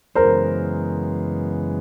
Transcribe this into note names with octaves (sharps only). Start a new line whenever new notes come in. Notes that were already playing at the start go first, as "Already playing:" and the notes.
F#2 C#3 E3 G#3 B3 A#4 C5